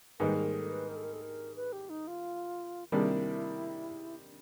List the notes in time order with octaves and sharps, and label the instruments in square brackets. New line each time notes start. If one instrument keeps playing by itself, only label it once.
[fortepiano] G#2 D#3 G3 A#3 D#4 [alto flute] B4
[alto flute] A#4
A4
B4
A#4
A4
A#4
A4
A#4
B4
G4
D#4
F4
[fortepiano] C3 D#3 G3 A#3 D4 [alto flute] E4